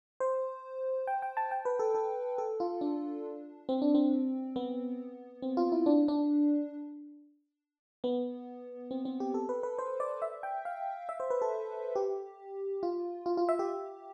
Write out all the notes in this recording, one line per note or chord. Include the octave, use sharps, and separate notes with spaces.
C5
G5
G5
A5
G5
B4
A4
A4
A4
F4
D4
C4
D4
C4
B3
C4
F4
E4
D4
D4
B3
C4
C4
G4
A4
B4
B4
C5
D5
E5
G5
F5
E5
C5
B4
A4
G4
F4
F4
F4
E5
G4